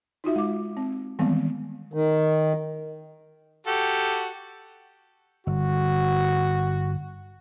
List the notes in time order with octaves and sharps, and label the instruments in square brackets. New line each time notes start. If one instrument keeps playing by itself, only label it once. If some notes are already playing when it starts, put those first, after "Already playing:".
[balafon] D#4 F4 F#4 E5
G#3 D6
C4
D#3 E3 G3 G#3 B3 C4
[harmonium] D#3
[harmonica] F#4 G4 A4
[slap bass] G1 [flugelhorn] F#4